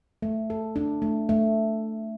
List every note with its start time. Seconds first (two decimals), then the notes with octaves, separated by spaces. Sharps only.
0.22 A3
0.50 A4
0.76 D4
1.02 A3
1.29 A3